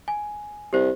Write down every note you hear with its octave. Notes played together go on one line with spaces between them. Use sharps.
G#5
C2 G4 C5